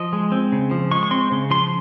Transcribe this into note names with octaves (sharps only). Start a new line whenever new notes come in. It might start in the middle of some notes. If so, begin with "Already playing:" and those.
Already playing: F3 D#5
G#3
C4
C#3
F3
G#3 C#6
C#6
C4 C6
C#3
F3 C6